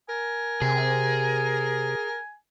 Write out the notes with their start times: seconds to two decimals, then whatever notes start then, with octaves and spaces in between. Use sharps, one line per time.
0.09 A#4 G#5
0.62 C3 G#4